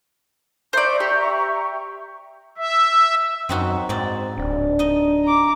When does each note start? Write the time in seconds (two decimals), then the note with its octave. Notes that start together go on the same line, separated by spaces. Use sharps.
0.73 C5 D5 E5 A#5 C#6
1.00 G4
2.58 E5
3.49 F#2 C4 D#4 F#4
3.89 G#2 C4 D#4 D5
4.38 D1 D4
4.79 D#4 D#5
5.24 A#5 D6